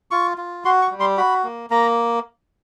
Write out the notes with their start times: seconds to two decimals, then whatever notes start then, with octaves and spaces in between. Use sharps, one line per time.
0.11 F4 C#6
0.38 F4
0.65 F#4 C6
0.82 C#6
0.91 G3
1.00 C6
1.17 F#4 B5
1.44 A#3
1.70 A#3 A#5